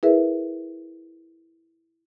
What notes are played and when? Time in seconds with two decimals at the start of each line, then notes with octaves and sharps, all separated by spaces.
0.03 E4 G#4 A#4 B4 E5